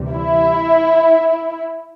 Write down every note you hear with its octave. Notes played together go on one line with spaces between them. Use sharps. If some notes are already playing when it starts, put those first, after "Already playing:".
Already playing: D2 C3 E3 G3
E4